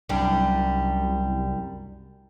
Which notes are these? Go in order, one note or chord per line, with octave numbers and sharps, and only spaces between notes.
C2 F#2 G3 D4